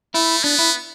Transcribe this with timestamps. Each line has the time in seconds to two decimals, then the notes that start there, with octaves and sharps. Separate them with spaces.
0.14 A3 E4
0.44 B3 D4
0.59 E4